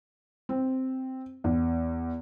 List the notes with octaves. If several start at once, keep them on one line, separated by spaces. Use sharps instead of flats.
C4
E2